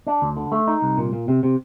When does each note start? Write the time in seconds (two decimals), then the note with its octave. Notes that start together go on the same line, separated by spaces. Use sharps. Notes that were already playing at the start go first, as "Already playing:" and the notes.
0.07 D4
0.22 D2
0.37 D3
0.52 A3
0.67 D#4
0.82 C2
0.97 A#2
1.13 A#2
1.28 C3
1.43 C3